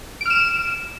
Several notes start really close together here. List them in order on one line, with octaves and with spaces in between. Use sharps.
D7 F6 E7